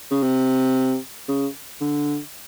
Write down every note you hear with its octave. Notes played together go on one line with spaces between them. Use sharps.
C#3
C3
C#3
D3